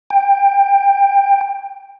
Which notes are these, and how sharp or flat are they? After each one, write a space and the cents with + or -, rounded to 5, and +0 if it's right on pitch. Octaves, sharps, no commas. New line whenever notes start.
G5 +15